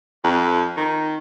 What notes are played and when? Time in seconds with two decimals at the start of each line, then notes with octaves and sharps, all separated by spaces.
0.24 F2
0.77 D#3